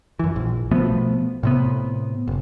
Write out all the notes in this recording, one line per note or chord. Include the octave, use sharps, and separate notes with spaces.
F#2 E3
A#1
B2 F3 A3 B3
A2 C3 B3
F#1